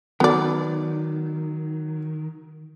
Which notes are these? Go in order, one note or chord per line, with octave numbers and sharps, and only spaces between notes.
D#3 F#3 B3 D5